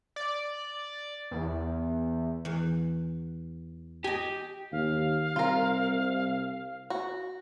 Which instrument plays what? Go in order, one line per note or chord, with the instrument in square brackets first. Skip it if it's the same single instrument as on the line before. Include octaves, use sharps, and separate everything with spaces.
[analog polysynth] D5
E2
[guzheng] E2
[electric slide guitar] G4 [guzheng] D#5 G#5
[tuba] D#2 [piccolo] F5
[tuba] C2 [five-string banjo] F4 A#4
[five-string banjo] F#4